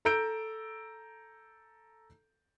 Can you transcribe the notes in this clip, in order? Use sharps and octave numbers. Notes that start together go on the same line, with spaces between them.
A4 A#5 E6 G6 D7